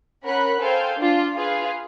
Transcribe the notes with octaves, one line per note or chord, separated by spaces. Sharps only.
C#4 A#4 F#5 B5 F#6
A4 C5 F5 G5 G#5 G6
D4 F4
F4 G#4 B4 F5